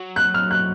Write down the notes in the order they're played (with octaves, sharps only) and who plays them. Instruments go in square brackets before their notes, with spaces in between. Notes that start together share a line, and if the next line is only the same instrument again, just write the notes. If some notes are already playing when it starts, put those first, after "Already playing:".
Already playing: [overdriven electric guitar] F#3
[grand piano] F#6
F6
F#6